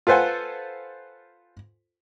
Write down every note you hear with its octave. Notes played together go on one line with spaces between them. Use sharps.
F4 A4 B4 C5 F#5 G#5